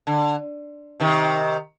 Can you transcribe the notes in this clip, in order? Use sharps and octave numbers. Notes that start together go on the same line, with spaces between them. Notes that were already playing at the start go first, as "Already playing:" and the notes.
D3
C3 D#3